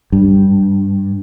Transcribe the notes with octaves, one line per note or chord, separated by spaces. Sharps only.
G2